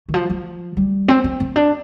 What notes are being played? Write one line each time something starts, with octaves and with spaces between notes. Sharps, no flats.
D#3
F3
F3
G3
C4
C4
C4
D4